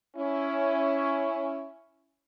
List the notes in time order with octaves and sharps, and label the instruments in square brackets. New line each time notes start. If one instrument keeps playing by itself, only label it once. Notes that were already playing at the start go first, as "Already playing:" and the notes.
[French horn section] C#4 E4